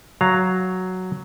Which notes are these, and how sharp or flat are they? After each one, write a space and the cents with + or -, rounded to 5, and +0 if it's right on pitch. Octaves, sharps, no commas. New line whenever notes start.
F#3 +0 F5 +0 A#5 +0